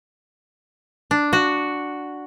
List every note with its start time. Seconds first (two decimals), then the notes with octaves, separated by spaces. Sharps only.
1.11 D4
1.33 F#4